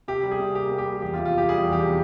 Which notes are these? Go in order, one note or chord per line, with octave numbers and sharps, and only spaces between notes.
C3 G4
G3
G#4
C3
A#3 G4
C3
G4
G3
E2 G4
F4
C3
F4
E2 G4
G3 G#4
E2
G4
C3